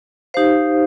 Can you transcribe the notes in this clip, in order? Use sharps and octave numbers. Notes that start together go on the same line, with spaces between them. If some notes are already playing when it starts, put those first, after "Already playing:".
D#4 G4 C5 F5